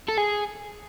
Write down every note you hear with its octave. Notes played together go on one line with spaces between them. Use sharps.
A4
G#4